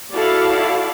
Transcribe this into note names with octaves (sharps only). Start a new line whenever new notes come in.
E4 F#4 A4 D5 F5 A5